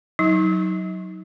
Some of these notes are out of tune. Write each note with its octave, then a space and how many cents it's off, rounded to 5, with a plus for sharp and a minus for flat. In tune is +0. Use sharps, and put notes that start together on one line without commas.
F#3 +5 D#4 +30